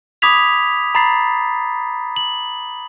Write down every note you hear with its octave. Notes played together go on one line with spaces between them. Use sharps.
B5 D6 D#6 G#6 B6 F7
A#5 B5 A6 C7
F#7